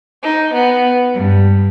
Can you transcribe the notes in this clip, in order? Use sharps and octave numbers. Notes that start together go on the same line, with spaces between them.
D#4
B3
G2